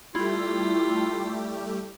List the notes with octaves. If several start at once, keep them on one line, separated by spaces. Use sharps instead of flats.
G3 A3 E4 F4 G4